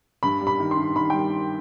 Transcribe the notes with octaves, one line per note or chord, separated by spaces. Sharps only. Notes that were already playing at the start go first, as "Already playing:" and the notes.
G2 B5
G3
B5
D#3
C6
G2
D#3 B5
G3 G5